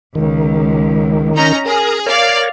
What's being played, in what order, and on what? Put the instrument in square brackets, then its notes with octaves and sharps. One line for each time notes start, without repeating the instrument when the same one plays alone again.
[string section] C#2 [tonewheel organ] D#3
[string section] C#4 D#4 A#5
[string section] G#4 [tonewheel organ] A#4 D#6
[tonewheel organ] A#4 C#5 [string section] D5 F5